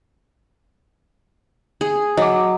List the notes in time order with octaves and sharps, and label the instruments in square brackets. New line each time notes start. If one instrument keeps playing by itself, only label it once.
[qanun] G#4
[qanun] F#3 [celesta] D#5 D6